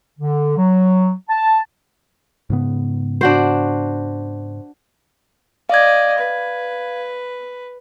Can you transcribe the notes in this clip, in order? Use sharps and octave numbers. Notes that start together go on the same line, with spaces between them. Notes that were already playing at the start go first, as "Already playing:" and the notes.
D3
F#3
A5
G#2 C#3 B3
D4 F#4 C5
D5 D#5 F5 G#6
B4